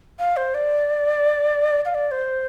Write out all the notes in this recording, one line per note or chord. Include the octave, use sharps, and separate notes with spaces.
F5
C5
D5
F5
D5
C5